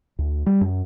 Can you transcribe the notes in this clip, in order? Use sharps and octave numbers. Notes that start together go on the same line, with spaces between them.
D2
G3
F#2